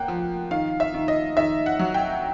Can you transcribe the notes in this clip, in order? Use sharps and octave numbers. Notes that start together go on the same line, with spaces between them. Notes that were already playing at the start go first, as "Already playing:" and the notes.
Already playing: A#3 F#5 G5
F3
D#3 F5
E5
D#3
D#5
D#3 E5
F#5
F#3
G5